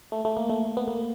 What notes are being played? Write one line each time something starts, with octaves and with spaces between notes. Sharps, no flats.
A3
A3
A#3
A3
B3
A#3